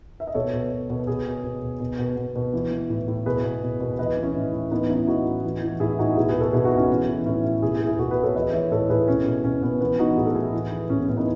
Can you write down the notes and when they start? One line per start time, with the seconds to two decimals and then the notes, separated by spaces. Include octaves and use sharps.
0.20 E5
0.27 D#5
0.35 B2 A4 C#5
0.53 B2
0.71 B2
0.90 B2
1.07 B2 G#4 B4
1.26 B2
1.44 B2
1.62 B2
1.80 B2
1.99 B2
2.17 B2
2.36 B2
2.54 E3
2.71 E3
2.90 A2
3.08 A2
3.26 B2 G#4 B4
3.44 B2
3.63 B2
3.80 B2
3.99 E3 B4 D#5
4.17 E3
4.23 C#4 E4
4.35 A2
4.53 A2
4.71 E3 B3 D#4
4.89 E3 C#4 E4
5.07 A2 D#4 F#4
5.26 A2
5.45 E3
5.62 E3
5.80 A2 E4 G#4
5.99 A2 D#4 F#4
6.17 B2 E4 G#4
6.29 G#4 B4
6.36 B2
6.41 F#4 A4
6.53 B2 E4 G#4
6.65 D#4 F#4
6.72 B2
6.77 C#4 E4
6.90 E3
7.08 E3
7.25 A2 C#4 E4
7.44 A2
7.62 B2 E4 G#4
7.74 E4 G#4
7.81 B2
7.87 E4 G#4
7.99 B2 F#4 A4
8.11 G#4 B4
8.17 B2
8.23 A4 C#5
8.35 E3 B4 D#5
8.53 E3 C#5 E5
8.71 A2 A4 C#5
8.90 A2 G#4 B4
9.08 B2 C#4
9.26 B2
9.44 B2 C#4
9.63 B2 B3
9.81 E3 B3
9.99 E3 D#4 F#4
10.17 A2 G#4
10.26 A4
10.35 A2 E4 G#4
10.53 E3
10.72 E3
10.89 A2 C#4
10.99 B3
11.08 A2 C#4
11.17 B3 D#4